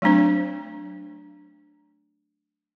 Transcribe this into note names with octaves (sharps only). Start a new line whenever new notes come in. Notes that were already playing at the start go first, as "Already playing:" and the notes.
F#3 A3 C4 D4 C5